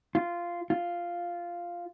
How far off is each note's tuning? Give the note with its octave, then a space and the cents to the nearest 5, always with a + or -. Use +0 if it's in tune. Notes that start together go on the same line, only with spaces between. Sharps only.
F4 -10
F4 -5